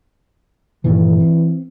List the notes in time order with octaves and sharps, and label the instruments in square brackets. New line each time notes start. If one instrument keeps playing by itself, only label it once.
[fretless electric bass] G2 A#2 D#3 [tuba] E3
[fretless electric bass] C4